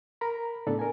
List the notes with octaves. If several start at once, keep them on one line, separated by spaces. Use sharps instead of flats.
A#4 A#5 B5
A2 C#3 B3 D4 A4 D5
A#4 G#5